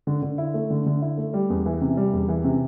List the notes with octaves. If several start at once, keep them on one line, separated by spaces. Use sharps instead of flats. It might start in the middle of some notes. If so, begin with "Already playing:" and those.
D3
D3
E4
A3
D3
D3
E4
A3
G3
E2
E3
C3
G3
E2
E3
C3